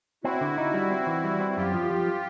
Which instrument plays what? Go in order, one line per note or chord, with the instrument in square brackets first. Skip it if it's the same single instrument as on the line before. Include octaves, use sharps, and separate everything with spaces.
[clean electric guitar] C4 [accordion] E4 F#4
[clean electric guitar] D3
D#4
G3
C4
E3
G3
C4
[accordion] F#4
[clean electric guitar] F#2 [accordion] F4 G4
[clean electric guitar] F3
F3